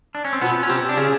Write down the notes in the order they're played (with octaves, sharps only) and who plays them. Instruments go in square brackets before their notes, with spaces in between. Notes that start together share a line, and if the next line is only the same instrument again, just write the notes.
[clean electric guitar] D4
C#4
C4
[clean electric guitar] B2 B3 [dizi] F4
[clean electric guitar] C#4
[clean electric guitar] C3 C4 [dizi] G4
[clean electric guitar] D4
[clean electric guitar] C#3 C#4 [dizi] G#4